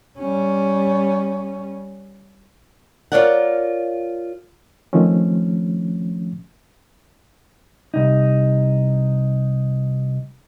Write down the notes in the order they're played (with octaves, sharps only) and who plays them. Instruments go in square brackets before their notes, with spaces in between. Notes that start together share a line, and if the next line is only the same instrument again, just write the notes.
[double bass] G3 C#4
[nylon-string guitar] F4 A#4 C#5 D5 F5 F#5
[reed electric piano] D#3 F3 A3 C4 C#4
[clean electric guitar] C2 D#4